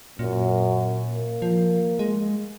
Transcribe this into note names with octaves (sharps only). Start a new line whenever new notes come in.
F#2 A#2
A#3
F3
G#3